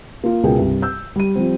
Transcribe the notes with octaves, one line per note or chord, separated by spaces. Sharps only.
A#3 F4
C#2 B2 G#4 A#4 G5
C2 G2 G3
E6 G6
G3 D#7
F3 G3 C4